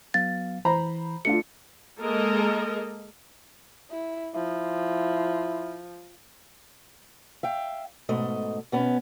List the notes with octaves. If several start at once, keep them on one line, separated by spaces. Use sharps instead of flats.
F#3 B3 F5 A6
E3 C5 A#5 B5
A3 D4 F4 C#7
G#3 A#3 A4 A#4 D#5
E4
F3 E4
E5 F5 G5
G#2 B2 A3 D#5
B2 B3 C#4